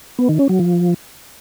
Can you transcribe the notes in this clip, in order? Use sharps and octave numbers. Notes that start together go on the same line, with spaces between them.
B3
D#3
C#4
F#3
F3